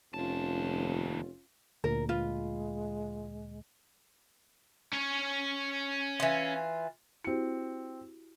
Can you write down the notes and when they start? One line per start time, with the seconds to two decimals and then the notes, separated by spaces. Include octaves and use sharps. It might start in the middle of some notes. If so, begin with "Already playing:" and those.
0.14 F1 D#2 C#4 F4 A5
1.84 D2 A#2 A#4
2.09 G#3 F4 B4
4.93 C#4 C#5
6.20 E3 F4
7.24 C4 E4 F#4 G4 C#7